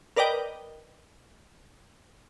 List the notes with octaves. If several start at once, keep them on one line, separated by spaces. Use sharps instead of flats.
A#4 B4 D5 D#5 G5